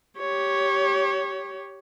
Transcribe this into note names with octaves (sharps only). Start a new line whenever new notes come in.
G4 C#5